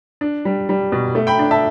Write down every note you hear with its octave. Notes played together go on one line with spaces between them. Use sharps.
D4
G3
G3
B2
A3
G5 B5
D4
E5 A5